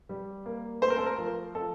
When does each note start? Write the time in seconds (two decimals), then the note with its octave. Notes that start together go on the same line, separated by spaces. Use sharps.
0.09 G3
0.46 A#3
0.82 A3 C5
0.90 A#4
0.98 A4
1.06 A#4
1.18 F3
1.54 F3 A4